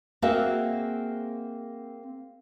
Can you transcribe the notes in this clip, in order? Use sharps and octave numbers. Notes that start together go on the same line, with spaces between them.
A#3 C4 F#4 G#4 E5